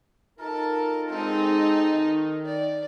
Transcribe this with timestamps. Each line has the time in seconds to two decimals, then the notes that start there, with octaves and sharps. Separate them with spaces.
0.39 D#4 F4 A4 A#4 A5
1.09 G#3 C4 D#4 A4
1.95 D#3
2.46 D5